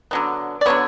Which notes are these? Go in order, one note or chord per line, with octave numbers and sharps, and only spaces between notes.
D3 F#3 B3
D5
D3 F#3 B3 C#5